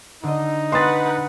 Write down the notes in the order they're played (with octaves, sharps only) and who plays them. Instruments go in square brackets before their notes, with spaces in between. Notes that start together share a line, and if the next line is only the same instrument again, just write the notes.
[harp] D3 D#5 [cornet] D#4
[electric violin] B4 F#5 [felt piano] C6 D#6 A6